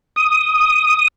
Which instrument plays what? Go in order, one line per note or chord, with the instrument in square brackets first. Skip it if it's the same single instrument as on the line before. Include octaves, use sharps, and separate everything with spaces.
[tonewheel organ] D#6